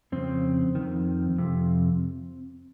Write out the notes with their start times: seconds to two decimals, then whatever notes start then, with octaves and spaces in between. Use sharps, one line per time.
0.12 F2 C#3 C4
0.75 F2 D#3
1.38 F2 C3